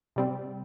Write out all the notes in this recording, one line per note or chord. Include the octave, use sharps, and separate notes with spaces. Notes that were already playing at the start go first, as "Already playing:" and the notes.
C3 G3 C4